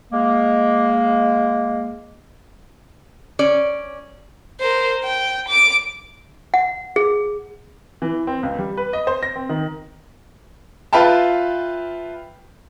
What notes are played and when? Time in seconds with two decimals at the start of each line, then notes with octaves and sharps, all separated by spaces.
0.11 G#3 A#3
3.39 C#4 D5
4.60 A#4 C5
5.04 G5
5.49 D6 D7
6.54 F#5
6.96 G#4
8.02 E3
8.27 C4
8.43 C#2
8.59 G3
8.77 B4
8.93 D#5
9.07 C5
9.23 A#6
9.36 C4
9.49 D#3
10.93 F4 B4 E5 F5 G5 A5